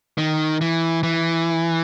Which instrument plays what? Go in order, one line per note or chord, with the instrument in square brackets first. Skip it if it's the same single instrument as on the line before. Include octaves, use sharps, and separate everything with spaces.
[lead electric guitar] D#3
E3
E3